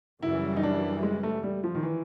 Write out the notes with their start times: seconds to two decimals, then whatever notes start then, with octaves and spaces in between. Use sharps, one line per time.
0.22 F#2 C#3 E3 G3 E4
0.57 D#4
0.63 D4
1.03 G#3
1.23 A3
1.43 G3
1.64 F3
1.75 D#3
1.83 E3